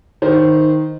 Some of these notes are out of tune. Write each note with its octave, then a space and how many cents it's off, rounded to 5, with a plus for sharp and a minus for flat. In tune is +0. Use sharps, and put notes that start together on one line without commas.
D#3 +0 C5 -20